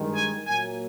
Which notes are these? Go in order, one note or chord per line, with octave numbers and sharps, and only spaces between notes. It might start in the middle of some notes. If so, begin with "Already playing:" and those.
Already playing: G2 D#3 G#3
G#5
A#2 F#3 A#3 G#5